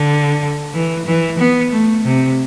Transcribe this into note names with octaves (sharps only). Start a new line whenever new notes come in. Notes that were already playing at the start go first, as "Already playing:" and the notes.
Already playing: D3
E3
E3
B3
A3
C3